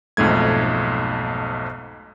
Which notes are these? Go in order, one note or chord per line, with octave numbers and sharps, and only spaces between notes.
B1 F2 G#2 A3 G#6